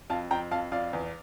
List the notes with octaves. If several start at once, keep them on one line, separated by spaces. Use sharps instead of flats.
F2 F5 A5
F2 G5 A#5
F2 F5 A5
F2 D5 F5
E2